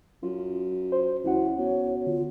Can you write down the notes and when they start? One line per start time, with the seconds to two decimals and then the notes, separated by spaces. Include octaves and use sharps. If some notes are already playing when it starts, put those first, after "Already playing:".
0.23 F#2 F4
0.92 C5
1.24 C#2 E3 C#4 F#4 F#5
1.58 B2 C#5
2.06 D3 F4